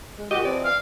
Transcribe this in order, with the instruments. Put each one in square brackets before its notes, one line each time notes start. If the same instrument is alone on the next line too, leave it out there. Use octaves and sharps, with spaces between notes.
[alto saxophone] G#3
[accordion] A#2 F#4 [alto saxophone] G4 [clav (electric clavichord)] D#5
[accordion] E3 F3 C4 [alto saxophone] D5
[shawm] F5